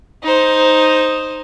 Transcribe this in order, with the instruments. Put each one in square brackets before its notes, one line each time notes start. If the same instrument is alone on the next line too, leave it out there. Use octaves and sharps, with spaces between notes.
[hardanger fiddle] D#4 C5